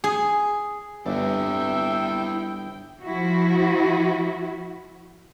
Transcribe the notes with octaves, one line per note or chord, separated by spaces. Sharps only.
G#4
G1 E4 D5 E5 G5
F3 E4 F#4